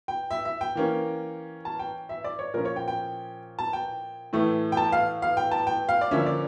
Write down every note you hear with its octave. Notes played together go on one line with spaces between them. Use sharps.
G5
E5
E5
G5
E3 A#3 C#4
A5
G5
E5
D5
C#5
A#2 F3 C#4 A#4
C#5
G5
G5
A5
G5
A2 E3 A3
G5
A5
F5
F5
G5
A5
G5
F5
D5
D3 F3 A#3 C#4 E5
D5